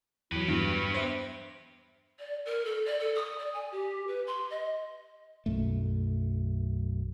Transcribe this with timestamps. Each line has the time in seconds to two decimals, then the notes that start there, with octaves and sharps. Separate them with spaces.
0.32 E2 F#3 E4 G4 B4
0.48 G2 B3
0.94 C5 E5
2.19 D5
2.45 A#4
2.64 A4
2.85 D5
2.99 A4
3.15 D#6
3.38 D5
3.53 G#5
3.71 G4
4.07 B4
4.26 C6
4.50 D#5
5.46 B1 F#2 A3